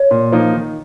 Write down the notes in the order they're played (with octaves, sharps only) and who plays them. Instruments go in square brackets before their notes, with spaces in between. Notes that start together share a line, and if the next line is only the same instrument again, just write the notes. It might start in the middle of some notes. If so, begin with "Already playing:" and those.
Already playing: [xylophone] C#5
[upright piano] A#2
F3 A#3 D#4
D#3